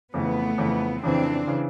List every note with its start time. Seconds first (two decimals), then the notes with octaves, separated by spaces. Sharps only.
0.14 F2 C#3 E3 A3 B3
0.58 F2 C#3 E3
1.03 F2 C#3 E3 C4 D4
1.47 C#3 E3